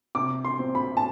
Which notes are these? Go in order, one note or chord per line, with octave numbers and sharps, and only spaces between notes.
C3 D6
C6
C4
B5
A5